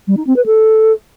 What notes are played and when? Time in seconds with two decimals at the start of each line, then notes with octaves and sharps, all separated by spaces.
0.07 G3
0.17 D#4
0.27 C4
0.36 B4
0.46 A4